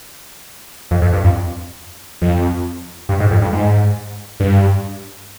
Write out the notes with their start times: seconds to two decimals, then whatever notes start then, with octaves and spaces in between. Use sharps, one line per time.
0.91 F2
1.02 F2
1.12 G2
1.24 F2
2.22 F2
3.09 G2
3.20 G#2
3.31 F2
3.42 G2
3.53 G#2
4.40 G2